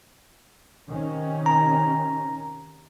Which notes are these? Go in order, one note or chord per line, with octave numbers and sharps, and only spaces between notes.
C3 D#3 C#4
A#5